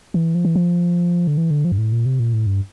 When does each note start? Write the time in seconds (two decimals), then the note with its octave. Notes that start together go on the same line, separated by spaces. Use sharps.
0.14 E3
0.35 F3
0.45 E3
0.55 F3
1.27 D3
1.37 E3
1.51 D3
1.65 F3
1.72 G2
1.78 A2
1.92 A#2
2.06 C3
2.20 A#2
2.33 A2
2.46 G2